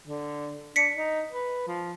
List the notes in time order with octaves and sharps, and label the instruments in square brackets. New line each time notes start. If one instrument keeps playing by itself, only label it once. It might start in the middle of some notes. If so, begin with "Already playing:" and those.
[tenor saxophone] D3
[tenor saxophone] D4 [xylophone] B6 C#7
[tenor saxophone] D#4
B4
F3